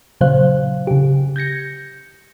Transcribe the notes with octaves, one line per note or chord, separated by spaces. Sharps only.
A#2 C#3 F#3 C5 F5 F#6
C#3 G4
G6 G#6 A#6 C#7